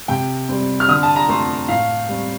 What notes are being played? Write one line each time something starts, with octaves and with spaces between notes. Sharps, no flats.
C3 G5
G3 C4
F6
D3 D#6
A5
A#5
A3 C4 C6
A2 F5
G3 C4